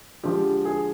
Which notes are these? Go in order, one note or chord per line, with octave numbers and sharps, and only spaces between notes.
D3 F3 G#3 G4
G#4